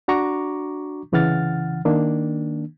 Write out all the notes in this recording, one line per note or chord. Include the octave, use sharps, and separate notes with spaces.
D4 F#4 A#5 C#6 D6
C2 C#3 E3 F#5 F6 A6
D#3 A#3 D4